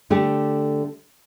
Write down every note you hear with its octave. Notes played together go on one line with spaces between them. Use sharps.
D3 A3 G4